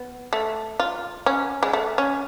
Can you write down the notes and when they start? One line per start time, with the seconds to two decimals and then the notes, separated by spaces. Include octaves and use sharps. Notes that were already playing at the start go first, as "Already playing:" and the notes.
Already playing: B3
0.33 A3
0.80 F4
1.26 C#4
1.63 G#3
1.73 A3
1.98 C#4